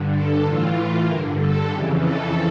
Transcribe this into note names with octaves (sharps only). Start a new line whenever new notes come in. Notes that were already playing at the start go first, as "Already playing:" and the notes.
Already playing: G2 D3
A4
A2 E3 F4
G2 D3 A#4
A4
F2 C#3 E3 G4
A4